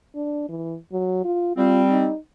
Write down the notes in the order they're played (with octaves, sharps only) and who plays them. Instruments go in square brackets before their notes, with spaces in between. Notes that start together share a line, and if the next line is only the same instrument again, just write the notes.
[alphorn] D4
E3
F#3
F4
[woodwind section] G3 C4 [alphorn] F4
[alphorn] D#4